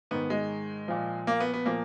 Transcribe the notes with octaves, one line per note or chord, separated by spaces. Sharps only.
G#2 D#3 B3
G#3
A#2 F3
A#3
B3
B3
A#2 F3 A#3